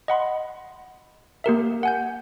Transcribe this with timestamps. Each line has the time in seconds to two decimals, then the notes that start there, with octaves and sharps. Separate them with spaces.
0.08 D#5 F#5 B5 C6
1.44 A#3 G4 A#4 E5
1.83 F#5 G#5 G6